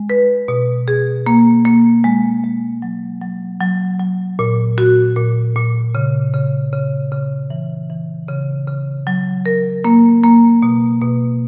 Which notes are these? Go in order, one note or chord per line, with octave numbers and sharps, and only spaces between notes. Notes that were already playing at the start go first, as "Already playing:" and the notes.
Already playing: G#3
B4
B2
G#4
A#3
A#3
G#3
G#3
F#3
F#3
F#3
F#3
A#2
F#4
A#2
A#2
C#3
C#3
C#3
C#3
E3
E3
C#3
C#3
F#3
A#4
A#3
A#3
B2
B2